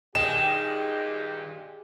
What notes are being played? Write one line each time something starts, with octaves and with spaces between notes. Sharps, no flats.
G2 A#2 D#3 G#3 G4 E7